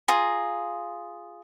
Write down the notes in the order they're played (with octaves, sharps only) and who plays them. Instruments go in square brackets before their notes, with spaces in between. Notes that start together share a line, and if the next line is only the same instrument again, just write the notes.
[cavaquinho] F4 G#4 A#5